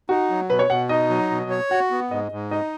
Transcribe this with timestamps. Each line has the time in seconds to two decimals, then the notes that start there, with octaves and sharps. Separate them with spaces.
0.09 D#4 F#4
0.30 F#3
0.49 B2 B4
0.59 C#5
0.70 B2 F#5
0.89 D#4 D#5
1.10 F#3
1.30 B2
1.50 C#5
1.71 F#4 F#5
1.91 B3
2.11 G#2 D#5
2.32 G#2
2.51 D#4 D#5